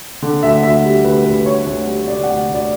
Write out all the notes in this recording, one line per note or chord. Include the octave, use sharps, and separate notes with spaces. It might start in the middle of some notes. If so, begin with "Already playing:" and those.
D3
D2 E5
D2 E5
G3
D2 B4
D2 B4
G3 C#5
D2
G3
D3 D5
F#5
D2
D2
D5